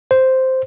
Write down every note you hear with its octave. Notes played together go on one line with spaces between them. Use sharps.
C5